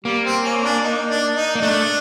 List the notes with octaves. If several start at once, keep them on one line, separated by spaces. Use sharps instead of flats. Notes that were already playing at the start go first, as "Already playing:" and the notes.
G3 A#3
C4
C#4
D4
D#4
D4
D#4
A#3
A3 D4